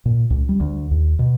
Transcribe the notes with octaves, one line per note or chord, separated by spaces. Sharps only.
A#2
C#2
G3
D2
D#2
B2